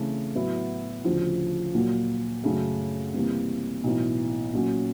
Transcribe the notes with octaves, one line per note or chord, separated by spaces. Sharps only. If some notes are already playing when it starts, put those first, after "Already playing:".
Already playing: C#3 E3 A3 C4
A2 F#3 B3 E4
D2 C#3 F3
A#2 F#3 A#3
F#2 C#3 F#3 A3
C3 E3 G3 A#3
B1 A2 E3
A#2 F#3 A#3 C#4